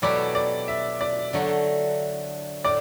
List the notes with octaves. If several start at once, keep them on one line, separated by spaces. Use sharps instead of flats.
B2 F#3 A3 E4 G4 D5
D5
E5
D5
D3 F#3 A3
A2 D5